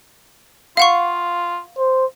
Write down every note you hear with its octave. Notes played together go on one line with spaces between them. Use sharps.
F4 F5 F#5 C#6
C5